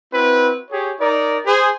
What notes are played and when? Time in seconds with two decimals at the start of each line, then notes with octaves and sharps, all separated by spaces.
0.13 C4 E4 F#4 B4
0.71 G4 G#4 C#5
1.00 D#4 A#4 D5
1.46 G#4 C5